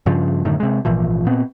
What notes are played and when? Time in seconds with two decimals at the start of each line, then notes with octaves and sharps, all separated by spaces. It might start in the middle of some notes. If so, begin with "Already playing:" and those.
0.06 G2 C#3 F3
0.45 F#2 A2 D3 D#3
0.60 C3 G#3
0.85 G#1 A#2 E3 F3
1.26 A#2 B3 C4